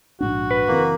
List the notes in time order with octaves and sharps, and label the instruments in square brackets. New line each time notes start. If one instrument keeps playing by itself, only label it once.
[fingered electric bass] A#1 G#2 D4 [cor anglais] F#4
[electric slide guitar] B4
[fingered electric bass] F#1 E3 C4 [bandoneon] A#3